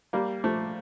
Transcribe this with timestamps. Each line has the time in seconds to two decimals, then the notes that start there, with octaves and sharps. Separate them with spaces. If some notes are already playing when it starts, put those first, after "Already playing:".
0.13 G3 A#3
0.44 F3 A3